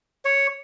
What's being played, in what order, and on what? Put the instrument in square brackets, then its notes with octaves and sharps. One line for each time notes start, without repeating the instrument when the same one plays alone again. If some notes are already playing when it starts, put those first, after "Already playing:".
[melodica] C#5